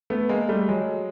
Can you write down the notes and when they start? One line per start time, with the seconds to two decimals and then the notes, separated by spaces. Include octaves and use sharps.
0.10 A3 B3
0.29 G#3 A#3
0.49 G3 A3
0.69 F#3 G#3